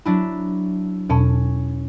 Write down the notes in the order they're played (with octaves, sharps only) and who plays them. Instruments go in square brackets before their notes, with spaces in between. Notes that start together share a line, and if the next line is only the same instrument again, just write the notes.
[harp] F#3 D4 E4
[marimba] E2 B2 A5 [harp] C#4